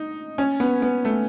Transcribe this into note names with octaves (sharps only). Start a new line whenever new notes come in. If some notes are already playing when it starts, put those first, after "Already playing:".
Already playing: D#4
C#4
B3
B3
A3